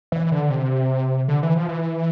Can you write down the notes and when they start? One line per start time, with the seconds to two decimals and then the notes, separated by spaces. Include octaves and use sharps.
0.12 E3
0.32 D3
0.50 C3
1.28 D3
1.43 E3
1.56 F3
1.69 E3